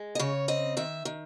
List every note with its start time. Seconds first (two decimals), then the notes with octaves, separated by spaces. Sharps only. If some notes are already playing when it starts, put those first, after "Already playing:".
Already playing: G#3
0.15 D#5
0.19 C#3 C#5
0.48 C4 D#5
0.77 D#3 E5
1.05 D#3